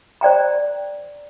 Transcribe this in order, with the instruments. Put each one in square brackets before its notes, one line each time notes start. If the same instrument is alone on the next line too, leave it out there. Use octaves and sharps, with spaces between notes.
[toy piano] C5 D5 G5 A#5